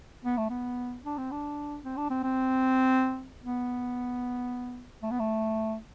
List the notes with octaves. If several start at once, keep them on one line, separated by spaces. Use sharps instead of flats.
B3
A3
B3
D4
C4
D4
C4
D4
C4
C4
B3
A3
B3
A3